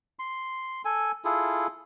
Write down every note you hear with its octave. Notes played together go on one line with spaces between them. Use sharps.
C6
A4 G#5
E4 F4 G#4 A4